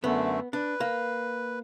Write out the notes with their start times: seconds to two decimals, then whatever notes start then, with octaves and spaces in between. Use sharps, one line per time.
0.04 F#2 D3 A3 B3
0.53 D4 B4
0.80 A#3